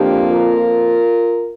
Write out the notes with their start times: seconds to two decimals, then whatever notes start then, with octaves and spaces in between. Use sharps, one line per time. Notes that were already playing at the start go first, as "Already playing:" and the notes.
Already playing: F2 F3 A#3 D4 G4
0.32 F4 A#4